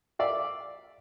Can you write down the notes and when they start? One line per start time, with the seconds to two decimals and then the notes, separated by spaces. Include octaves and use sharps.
0.19 D5 E5 F5